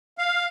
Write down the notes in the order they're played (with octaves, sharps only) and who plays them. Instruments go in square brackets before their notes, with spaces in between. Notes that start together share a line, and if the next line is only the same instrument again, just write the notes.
[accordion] F5